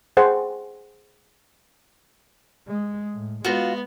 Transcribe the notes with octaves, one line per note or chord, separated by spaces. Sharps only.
G#4 C5 F#5
G#3
A2
G#3 B3 F4 F#4